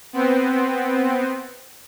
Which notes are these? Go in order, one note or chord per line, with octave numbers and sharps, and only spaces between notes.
B3 C4